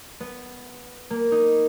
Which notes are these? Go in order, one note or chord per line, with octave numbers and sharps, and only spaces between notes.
B3
A#3
D#4